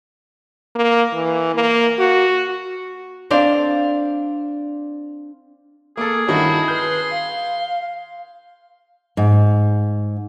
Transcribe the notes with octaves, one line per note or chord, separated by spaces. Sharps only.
A#3
E3
A#3
F#4
C4 D4 D5 F5
A#3 G#4 A4
G2 D#3 C#4 E4 F#4 A5
B4 C6 G6
F5
G#2